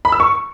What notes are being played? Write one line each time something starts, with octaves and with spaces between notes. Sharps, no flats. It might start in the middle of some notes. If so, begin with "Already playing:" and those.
B5
E6
C#6